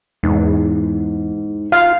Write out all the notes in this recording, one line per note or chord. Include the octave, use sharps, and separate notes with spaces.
E2 G#2
F4 F5